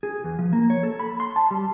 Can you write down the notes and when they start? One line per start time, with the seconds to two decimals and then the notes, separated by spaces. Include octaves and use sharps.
0.03 G#4
0.24 E2
0.39 F3
0.53 A#3
0.70 C#5
0.83 A4
0.99 B5
1.20 C6
1.36 A5
1.51 G3